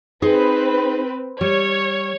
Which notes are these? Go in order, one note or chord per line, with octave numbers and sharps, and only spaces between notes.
C4 D#4 G#4 B4 C5
G3 C#5